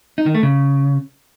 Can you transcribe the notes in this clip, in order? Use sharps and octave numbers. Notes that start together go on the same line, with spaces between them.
D#4
D#3
A3
C#3